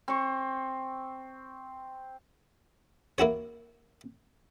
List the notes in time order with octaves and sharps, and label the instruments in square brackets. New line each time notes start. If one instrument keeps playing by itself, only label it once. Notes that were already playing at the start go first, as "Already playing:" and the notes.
[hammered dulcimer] C4 C#6
[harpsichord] A#3 E4 F#4 C#5